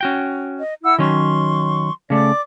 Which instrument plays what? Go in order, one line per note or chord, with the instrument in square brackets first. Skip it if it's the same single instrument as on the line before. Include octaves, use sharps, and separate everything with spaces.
[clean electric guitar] C#4 F#4 G5
[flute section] D#5
E4 F#5 E6
[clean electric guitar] D#3 F#3 C#4 [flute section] C6 C#6
[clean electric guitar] C#3 A3 [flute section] D5 D6